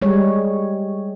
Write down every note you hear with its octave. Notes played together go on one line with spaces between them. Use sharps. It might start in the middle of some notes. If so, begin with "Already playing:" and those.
G3 G#3 C#5